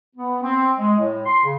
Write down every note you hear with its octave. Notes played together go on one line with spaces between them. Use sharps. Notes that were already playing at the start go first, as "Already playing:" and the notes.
B3
C4
G#3
A2
C6
C#3